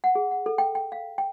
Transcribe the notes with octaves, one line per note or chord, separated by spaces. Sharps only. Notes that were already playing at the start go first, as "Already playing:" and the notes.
F#5
G#4
F#5
A4
G5
G5
F5
G5